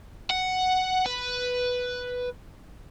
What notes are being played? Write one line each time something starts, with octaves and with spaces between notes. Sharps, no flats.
F#5
B4